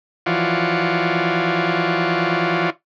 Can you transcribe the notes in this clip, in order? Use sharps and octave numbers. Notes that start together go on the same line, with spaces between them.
E3 F3 F4 F#4 C#5 D5